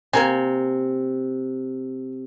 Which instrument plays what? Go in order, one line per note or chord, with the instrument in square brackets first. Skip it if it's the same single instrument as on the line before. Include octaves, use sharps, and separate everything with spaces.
[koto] C3 [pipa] A#3 A#4 G#5